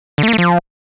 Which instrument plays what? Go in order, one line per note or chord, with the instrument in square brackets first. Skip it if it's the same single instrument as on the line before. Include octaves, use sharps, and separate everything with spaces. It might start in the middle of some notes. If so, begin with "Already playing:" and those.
[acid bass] D3
A3
A#3
A3
F3